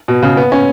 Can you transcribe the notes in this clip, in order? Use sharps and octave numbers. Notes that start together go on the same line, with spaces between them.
B2
C#3
B3
C#4